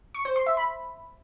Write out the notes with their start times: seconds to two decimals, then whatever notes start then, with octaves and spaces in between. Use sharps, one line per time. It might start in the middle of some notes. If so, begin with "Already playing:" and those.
0.15 C#6
0.25 C5
0.36 C6
0.46 E5
0.57 B5